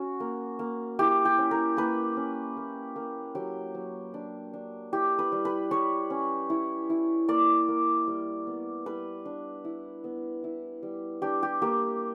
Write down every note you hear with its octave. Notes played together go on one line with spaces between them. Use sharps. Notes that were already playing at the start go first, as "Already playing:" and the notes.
Already playing: C#4 F#4
A#3
A#3
E4 G4
G4
C#4
A#4
A#3 B4
C#4
A#3
A#3
F#3 G4
F#3
D4
D4
E4 G4
B4
G3
B4
G3 C#5
C#4
E4
E4
A#3 D5
A#3
G3
B3
G3 B4
D4
E4
B3
E4
G3
D4 G4
G4
A#3 G4